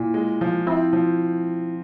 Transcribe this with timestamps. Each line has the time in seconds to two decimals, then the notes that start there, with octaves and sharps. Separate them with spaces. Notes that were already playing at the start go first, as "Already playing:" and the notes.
Already playing: A#2 E4
0.14 G#3
0.41 F3
0.67 C4 E4
0.93 F3